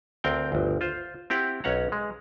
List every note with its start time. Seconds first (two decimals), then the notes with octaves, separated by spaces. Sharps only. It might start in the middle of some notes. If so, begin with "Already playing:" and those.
0.24 D2 C4 A#4 G5
0.52 G1 D2
0.81 F4 C5
1.30 C4 E4 G4 F#5
1.64 B1 C#4 C#5 F#5 A#5
1.92 G#3